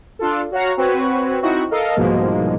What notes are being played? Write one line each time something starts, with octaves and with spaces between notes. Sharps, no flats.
D4 F4 A4
F#4 C#5 F5 F#5 A#5
C4 F#4 B4 C#5
C4 D#4 E4 F#4
A4 A#4 D#5 F5
C2 G#2 B2 F3 G#3 A#3